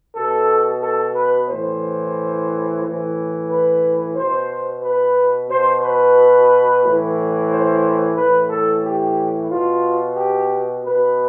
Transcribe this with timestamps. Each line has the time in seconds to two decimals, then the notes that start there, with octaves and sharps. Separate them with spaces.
0.16 B2 A4
0.82 A4
1.16 B4
1.49 A2 E3 C5
2.83 A2 E3
3.49 B4
4.16 B2 C5
4.83 B4
5.49 B2 C5
5.83 B4
6.83 A2 E3
7.50 C5
8.17 A2 E3 B4
8.50 A4
8.84 G4
9.50 B2 F4
10.17 G4
10.84 B2 B4